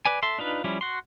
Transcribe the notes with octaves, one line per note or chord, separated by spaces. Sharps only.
B4 D5 G#5
A4 E5 C6
D4 D#4 F4 B4
F3 G3 C#4 E4
F#4 C6